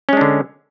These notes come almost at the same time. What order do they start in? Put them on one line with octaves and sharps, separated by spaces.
C#4 G#3 D4 D3